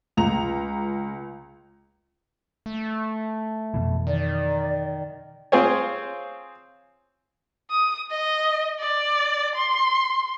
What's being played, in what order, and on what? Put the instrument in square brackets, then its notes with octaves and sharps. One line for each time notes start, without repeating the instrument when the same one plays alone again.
[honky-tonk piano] C#2 A#5 F7
[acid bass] A3
[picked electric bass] F2 B2 E3
[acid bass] D#3 [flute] D5
[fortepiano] C4 F4 G#4 C5 C#5
[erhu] D#6
D#5
D5
C6